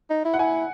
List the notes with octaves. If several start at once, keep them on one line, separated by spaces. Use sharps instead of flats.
D#4
E4
F#5
E4 G#5